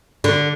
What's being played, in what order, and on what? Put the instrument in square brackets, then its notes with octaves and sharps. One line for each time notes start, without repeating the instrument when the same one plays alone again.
[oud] D3